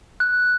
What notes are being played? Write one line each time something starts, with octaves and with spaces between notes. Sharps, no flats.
F#6